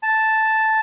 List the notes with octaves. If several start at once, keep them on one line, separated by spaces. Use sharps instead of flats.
A5